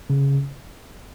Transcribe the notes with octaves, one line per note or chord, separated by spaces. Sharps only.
C#3